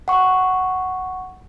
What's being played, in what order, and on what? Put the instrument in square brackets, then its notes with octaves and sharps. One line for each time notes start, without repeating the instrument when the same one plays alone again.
[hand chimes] F#5 C#6